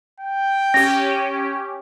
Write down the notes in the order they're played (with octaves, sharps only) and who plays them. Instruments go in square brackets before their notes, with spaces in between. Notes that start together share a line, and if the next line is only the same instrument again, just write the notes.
[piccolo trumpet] G5
[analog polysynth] C#4 G4 [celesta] A#6